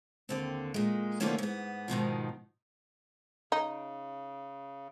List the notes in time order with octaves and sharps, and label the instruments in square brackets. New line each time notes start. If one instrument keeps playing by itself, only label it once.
[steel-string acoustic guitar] D#2 D3 C4
A#2 G#3
D3 D#3 F3 A3 A#3 C#4
G#2 B3
G#2 B2 D#3 F3
[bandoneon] C#3 [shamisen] D#4